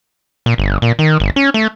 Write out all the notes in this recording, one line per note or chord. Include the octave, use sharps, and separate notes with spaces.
A#2
G1
A#2
D#3
G1
C#4
A3